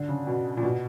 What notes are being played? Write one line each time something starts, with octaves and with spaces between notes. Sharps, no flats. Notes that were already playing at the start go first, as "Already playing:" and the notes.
Already playing: D3
C#3
B2
A#2
B2